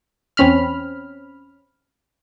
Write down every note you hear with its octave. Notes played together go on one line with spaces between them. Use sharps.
E2 C4 C#4 B5 F6